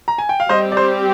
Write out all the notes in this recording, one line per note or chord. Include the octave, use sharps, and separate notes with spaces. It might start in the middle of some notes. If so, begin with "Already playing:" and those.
A#5
G#5
G5
F5
G3 C4 G4 C5 D#5
D5
C5